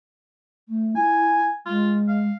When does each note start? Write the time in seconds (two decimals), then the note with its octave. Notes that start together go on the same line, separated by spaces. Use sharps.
0.69 A3
0.96 E4 G#5
1.66 G#3 F4
2.09 F5